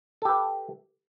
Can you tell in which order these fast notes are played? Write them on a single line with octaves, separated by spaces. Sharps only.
A4 G4 B4